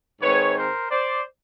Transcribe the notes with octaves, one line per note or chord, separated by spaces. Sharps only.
G#2 D#3 G#3 C4 B4 C#5
A#4 C5
C5 D5